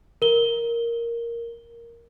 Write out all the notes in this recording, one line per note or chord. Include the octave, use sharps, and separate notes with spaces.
A#4 G7